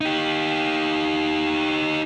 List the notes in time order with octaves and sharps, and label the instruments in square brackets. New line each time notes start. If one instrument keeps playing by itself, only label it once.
[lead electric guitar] D#4 G4